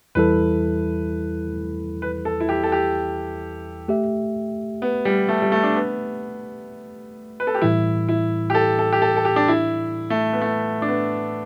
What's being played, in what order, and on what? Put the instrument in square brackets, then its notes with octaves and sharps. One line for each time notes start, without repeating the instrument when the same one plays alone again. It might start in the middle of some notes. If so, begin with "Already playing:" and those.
[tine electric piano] E2 E3 G3 E4 A4 [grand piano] B4
[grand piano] B4
A4
E4
G4
A4
G4
[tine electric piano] A3 G4 E5
[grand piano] B3
G3
A3
G3
A3
D4
B3
B4
A4
G4
[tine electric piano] A2 E3 G3 [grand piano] E4
[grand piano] E4
G4
A4
A4
G4
A4
A4
G4
D4
E4
A3
B3
A3
D4
B3